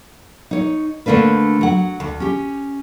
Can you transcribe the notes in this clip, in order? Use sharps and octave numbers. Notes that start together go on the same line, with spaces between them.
D#4 C#5
D3 A3 A#3 D4 B4
F#3 F#5
D2
C#4 G4